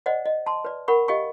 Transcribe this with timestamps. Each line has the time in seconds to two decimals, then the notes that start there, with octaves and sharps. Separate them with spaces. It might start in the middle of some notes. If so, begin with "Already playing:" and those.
0.06 C5 D5 D#5 F#5
0.26 D#5
0.46 A5 C6
0.65 B4 D5
0.88 A#4 F#5 B5 C#6
1.08 G4 D#5 F5 G5 C#6